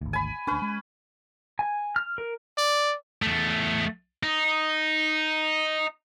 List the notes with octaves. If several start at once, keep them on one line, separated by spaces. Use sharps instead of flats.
G#1 D2
G#5 B5
D2 C#4 D4 B4
G#3
G#5
F6
A#4
D5
E2 A3
D#4